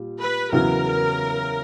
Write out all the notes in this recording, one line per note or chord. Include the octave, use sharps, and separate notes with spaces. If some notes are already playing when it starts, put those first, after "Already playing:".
Already playing: A#2 G3
B4
E2 C#3 F#3 B3 E4 A#4